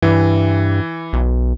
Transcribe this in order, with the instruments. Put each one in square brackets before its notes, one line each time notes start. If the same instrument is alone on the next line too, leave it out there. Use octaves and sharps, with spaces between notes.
[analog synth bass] G2 [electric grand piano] E3
[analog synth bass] B1